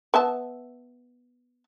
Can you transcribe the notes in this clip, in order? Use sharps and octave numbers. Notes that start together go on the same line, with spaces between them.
B3 E5 A5